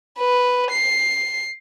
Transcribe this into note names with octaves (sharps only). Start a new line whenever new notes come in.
B4
C7